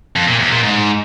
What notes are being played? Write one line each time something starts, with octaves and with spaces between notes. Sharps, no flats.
F2
A#2
E2
A#2
G#2